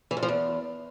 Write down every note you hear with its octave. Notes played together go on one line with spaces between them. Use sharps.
E3
F2
F3
E2